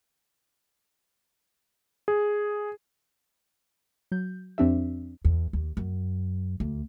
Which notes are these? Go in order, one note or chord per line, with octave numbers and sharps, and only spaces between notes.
G#4
F#3 G6
F2 C4 D4 G4 E5
E2
D#2
F#2
D2